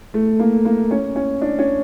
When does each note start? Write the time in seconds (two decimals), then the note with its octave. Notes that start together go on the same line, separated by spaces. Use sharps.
0.14 A3
0.39 A#3
0.65 A#3
0.91 C#4
1.16 C#4
1.41 D4
1.59 C#4